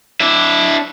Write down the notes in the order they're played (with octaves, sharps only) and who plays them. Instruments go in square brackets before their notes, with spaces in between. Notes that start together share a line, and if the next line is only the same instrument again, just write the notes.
[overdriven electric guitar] D4 E4